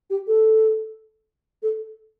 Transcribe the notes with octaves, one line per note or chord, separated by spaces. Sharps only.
G4
A4
A4